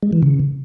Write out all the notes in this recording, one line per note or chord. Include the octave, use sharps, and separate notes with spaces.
G#3
E3
C#3